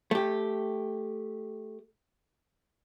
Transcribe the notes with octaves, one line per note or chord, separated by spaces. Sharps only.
A3 G4